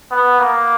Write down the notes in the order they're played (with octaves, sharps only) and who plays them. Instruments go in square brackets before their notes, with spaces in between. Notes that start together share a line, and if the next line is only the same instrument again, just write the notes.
[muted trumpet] B3
A#3